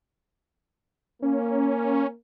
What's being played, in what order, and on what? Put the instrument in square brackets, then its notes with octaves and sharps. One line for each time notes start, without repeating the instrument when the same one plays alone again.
[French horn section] A#3 [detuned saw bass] C#4